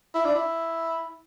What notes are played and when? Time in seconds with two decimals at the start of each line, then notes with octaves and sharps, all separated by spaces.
0.14 E4
0.25 D4
0.35 E4